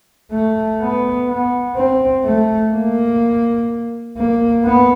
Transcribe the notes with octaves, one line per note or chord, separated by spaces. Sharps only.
A3
B3
B3
C4
A3
A#3
A#3
B3